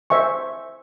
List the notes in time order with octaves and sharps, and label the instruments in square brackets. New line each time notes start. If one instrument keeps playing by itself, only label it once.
[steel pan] C5 E5 G#5 C#6